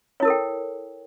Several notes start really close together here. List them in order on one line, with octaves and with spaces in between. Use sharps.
C#5 E4 A#4 A4 G5